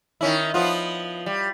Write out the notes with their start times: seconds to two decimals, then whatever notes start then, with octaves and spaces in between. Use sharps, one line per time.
0.21 D#3 C#4 E4
0.54 F3 B3 F4
1.26 G3